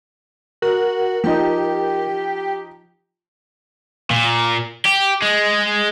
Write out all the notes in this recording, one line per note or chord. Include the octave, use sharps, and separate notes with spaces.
F#4 A#4
F3 D#4 G4
A#2
G4
G#3